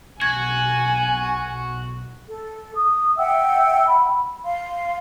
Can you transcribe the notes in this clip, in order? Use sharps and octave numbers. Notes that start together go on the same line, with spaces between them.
B1 F#4 G#5 G#6
A4
D#6
E5 F#5 G5 E6
B5
F5 C6